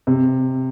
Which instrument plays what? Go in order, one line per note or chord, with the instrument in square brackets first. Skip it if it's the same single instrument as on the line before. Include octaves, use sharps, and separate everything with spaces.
[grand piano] C3